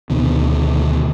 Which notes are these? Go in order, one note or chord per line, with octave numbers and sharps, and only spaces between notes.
D2 B2 D#3